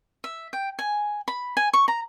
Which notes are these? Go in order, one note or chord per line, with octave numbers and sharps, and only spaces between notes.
E5
G5
G#5
B5
G#5
C#6
A#5